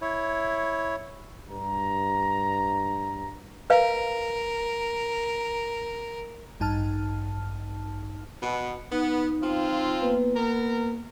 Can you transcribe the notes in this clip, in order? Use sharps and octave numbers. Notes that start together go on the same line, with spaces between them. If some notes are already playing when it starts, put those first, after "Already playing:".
E4 C#5
G2 A#5
A#4 B4 F5
A1 G2 D#4 A5 F6
B2 B3
B3 D#4
F3 C4 F4
A#3 B3 B4
A#3 B3 A#4